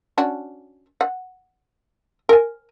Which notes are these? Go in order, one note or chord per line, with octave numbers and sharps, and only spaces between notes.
C#4 D4 F#4
F#5
A#4 G#5